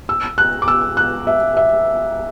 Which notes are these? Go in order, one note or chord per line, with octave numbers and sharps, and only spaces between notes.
E6
F#6
D6
E6
F#6
E5
E5